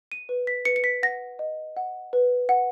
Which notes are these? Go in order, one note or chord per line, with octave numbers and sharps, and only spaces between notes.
D#7
B4
B6
B4 C#7
C#7
B6
F#5 A#6
D#5
F#5
B4
F#5